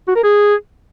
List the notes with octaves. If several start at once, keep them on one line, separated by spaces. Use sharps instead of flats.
F#4
A#4
G#4